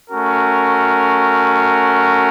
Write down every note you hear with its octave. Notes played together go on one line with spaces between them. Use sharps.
A3 C#4 F#4 A#4